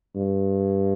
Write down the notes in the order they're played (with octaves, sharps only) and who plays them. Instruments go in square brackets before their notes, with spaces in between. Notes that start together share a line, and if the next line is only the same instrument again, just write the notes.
[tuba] G2